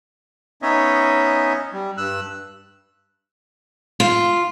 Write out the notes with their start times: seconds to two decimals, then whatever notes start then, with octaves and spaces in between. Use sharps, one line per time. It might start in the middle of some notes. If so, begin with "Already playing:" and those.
0.62 B3 C#4 D#4 C#5 D#5 E5
1.73 G3
1.97 G2 E6 F#6
4.00 F4